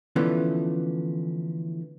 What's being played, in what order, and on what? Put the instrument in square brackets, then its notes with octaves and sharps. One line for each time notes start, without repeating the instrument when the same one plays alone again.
[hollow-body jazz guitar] D3 E3 F3 A3 B3 C#4